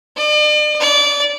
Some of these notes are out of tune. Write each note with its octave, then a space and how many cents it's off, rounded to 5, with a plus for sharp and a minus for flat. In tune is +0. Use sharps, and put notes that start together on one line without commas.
D5 +40
D5 -25